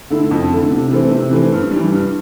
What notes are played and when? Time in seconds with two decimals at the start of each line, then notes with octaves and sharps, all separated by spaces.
0.10 D3 A3 E4
0.31 F2
0.50 D3 A3 E4
0.71 C3
0.91 E3 A3 C4
1.11 C3
1.31 E3 A3 C4
1.52 G2
1.71 E3 G3
1.92 G2